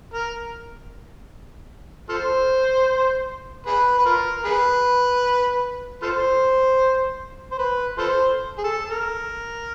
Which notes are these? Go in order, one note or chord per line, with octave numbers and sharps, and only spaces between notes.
A#4
F4 A4 C5
G#4 B4
B4
F4 A#4
G#4 B4
F4 A4 C5
C5
B4
F4 A4 C5
G#4
A4
A4
A#4